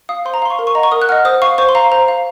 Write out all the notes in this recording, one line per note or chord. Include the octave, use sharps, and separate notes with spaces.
F5 D#6
C5 C6
A#5
F5 C6
C#6
A#4
C#6
D#5 F#5 A#5
C#6
A#4 D#6
F#6
D#5 F#5 F6
C5 D#6
F5 C#6
C5 C#6
C6
F5 A#5
C5 A#5
F5